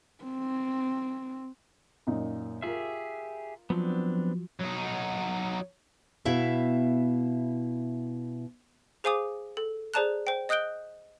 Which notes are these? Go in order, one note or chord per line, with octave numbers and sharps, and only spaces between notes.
C4
F#2 A#2 D#4
F4 G4 G#4 A#4 E5
F3 F#3 B3 C4 D4
F#3 D#4
B2 E4 E5 F5
G#4 C5 F5 G#5 D6 D#6
A4
G#4 C5 D5 A5 A#5 F#6
C5 G5
D#5 D#6 F#6 G6 D7 G7